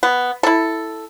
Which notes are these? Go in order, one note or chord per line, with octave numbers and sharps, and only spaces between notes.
B3
E4 A4